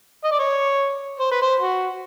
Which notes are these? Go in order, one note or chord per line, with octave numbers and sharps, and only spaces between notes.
D#5
D5
C#5
C5
B4
C5
F#4